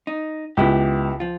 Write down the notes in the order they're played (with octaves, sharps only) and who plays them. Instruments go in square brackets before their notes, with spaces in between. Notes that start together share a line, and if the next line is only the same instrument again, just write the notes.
[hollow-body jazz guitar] D#4
[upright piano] C#2 [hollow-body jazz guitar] B3 E4 G4
[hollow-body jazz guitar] F3 F4